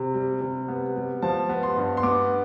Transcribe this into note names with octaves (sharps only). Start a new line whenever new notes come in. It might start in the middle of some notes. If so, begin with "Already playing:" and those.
Already playing: C3
G3
C3
B3
G3
F3 A5
B3
C6
G2
C6
B3 D6